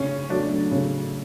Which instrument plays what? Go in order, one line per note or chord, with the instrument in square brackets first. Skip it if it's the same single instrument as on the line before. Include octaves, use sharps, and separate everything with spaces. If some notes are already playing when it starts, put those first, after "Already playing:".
Already playing: [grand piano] C#3 [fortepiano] C#4
[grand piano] F#3 A3 [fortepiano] D4
[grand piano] C#3